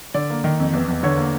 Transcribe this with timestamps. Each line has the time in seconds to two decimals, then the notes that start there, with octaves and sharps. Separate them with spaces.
0.14 D3 D5
0.30 A#3
0.44 D#3
0.60 F2
0.73 E2
0.88 E2
1.03 D3 C#5
1.17 A#3